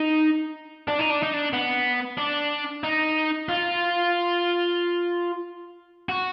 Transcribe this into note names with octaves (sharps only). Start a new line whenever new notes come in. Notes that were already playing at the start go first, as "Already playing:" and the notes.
Already playing: D#4
D4
D#4
D4
D#4
D4
B3
D4
D#4
F4
F#4